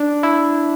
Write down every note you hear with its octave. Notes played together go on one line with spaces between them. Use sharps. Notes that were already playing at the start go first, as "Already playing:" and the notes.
Already playing: D4
E4